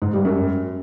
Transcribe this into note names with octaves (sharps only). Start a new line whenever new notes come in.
G#2
G3
F#2